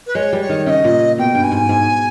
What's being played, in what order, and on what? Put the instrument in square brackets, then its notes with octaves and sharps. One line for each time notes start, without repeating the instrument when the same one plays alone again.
[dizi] B4
[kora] G#3 [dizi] C#5
[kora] G3
[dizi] C#5
[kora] D#3
[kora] C#3 [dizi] D#5 E5
[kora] A#2
[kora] B2 [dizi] G5
[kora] G2
[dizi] G#5
[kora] G#2
G#2